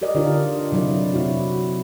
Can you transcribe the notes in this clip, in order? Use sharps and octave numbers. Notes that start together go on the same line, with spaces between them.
G4 A#4 D5 D#5
D3 D4 D#4 F4 A#4
C3 F#3 E4 D5
C3 E4 F#4